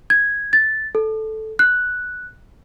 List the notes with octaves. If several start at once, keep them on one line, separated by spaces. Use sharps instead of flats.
G#6
A6
A4
F#6